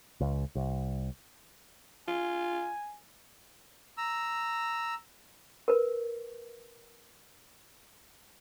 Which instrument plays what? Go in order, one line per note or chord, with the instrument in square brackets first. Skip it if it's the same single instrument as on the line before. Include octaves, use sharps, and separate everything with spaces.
[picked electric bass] C#2
C2
[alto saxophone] F4 [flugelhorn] G#5
[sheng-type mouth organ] A#5 E6
[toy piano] A#4 B4